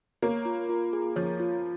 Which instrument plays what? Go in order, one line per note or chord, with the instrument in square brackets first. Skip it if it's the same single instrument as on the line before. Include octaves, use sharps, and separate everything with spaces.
[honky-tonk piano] A#3 [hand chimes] C#5
[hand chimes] F4
F4
G#4
[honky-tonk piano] F3 [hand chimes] C#5
[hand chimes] F4